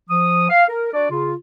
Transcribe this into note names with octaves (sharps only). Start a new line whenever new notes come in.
F3 D#6
F5
A#4
D4 F#4 D5
C#3 F4